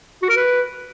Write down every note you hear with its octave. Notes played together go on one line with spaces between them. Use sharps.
F#4
A#4
B4